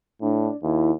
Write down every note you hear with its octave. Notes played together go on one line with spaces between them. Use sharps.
A2 D4
D#2 E4